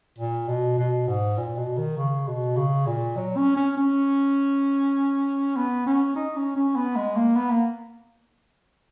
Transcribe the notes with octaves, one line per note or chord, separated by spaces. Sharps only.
A#2
B2
B2
G#2
A#2
B2
D#3
C#3
B2
C#3
A#2
F#3
C#4
C#4
C#4
B3
C#4
D#4
C#4
C#4
B3
G#3
A#3
B3
A#3